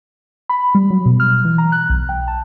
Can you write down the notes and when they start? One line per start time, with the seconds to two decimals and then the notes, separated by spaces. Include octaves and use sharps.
0.49 B5
0.75 G3
0.90 F#3
1.06 B2
1.20 F6
1.45 E3
1.58 A#5
1.72 F#6
1.90 B1
2.09 G5
2.28 A5